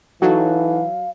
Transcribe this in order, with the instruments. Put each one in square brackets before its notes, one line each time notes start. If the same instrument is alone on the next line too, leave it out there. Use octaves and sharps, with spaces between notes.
[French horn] E3 [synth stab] F#3 [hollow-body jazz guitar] D#4 F#4 A4 [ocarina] F5